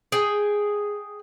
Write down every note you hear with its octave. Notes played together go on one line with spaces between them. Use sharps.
G#4 G5